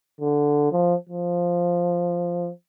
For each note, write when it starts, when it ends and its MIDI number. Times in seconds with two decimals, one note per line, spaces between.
0.21 0.70 50
0.72 0.95 53
1.09 2.50 53